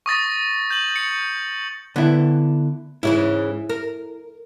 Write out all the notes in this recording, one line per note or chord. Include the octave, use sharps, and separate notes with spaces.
C#6 D#6 A6 A#6
G6 F#7
C#7
D3 B3 E4
G#2 C#3 E3 E4
A#4